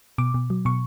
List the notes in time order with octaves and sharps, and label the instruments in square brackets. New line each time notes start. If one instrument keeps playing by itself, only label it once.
[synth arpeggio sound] B2 D6
B2
F#3
B2 C#6